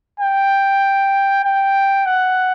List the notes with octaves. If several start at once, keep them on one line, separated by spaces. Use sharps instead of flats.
G5
G5
F#5